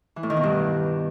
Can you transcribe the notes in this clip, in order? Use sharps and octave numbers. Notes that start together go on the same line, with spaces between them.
E3
A2
D#3
B2
G2